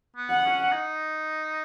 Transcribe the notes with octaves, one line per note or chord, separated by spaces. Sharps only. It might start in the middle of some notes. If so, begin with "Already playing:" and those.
B3
F#5
C#4
D#4